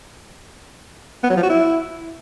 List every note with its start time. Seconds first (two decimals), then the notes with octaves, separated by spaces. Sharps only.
1.23 B3
1.30 F#3
1.37 F3
1.43 F#4
1.50 E4